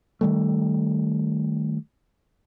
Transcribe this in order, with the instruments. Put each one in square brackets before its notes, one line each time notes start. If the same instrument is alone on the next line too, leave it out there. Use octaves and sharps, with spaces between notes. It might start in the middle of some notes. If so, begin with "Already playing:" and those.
[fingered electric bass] D#3 G3 A3